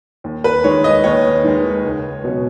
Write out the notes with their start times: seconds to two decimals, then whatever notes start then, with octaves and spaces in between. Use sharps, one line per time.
0.24 D#2
0.44 B4
0.64 D#3 G#3 C#5
0.84 D#5
1.04 D#2 C#5
1.44 D#3 G#3
1.84 C#2
2.24 B2 F#3 C#4